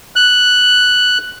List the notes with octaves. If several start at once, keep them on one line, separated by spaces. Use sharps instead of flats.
F#6